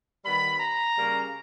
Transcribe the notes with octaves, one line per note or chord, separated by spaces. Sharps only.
D#3 G3 B3 B5
A#5
C#3 G3 A#3 C#4